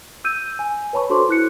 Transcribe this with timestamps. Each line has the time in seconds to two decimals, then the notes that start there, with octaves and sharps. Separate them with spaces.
0.24 E6 G6 D#7
0.59 G#5
0.93 B4 C#5 A5 B5 C#6
1.10 D4 F#4 A4 C5 C6 D6
1.29 E4 F#6 C#7